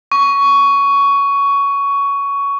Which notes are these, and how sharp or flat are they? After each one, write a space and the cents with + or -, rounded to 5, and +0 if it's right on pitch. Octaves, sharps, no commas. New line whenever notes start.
C#6 +15